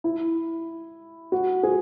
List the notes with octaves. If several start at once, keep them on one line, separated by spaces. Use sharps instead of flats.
E4
F#4
G#4